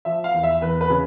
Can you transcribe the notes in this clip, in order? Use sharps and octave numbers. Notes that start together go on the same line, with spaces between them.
F3 E5
F5
E2
E5
E2 B4
B4
C#3